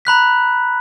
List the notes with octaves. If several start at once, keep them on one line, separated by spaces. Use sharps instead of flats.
A#5 B5 F#6 B6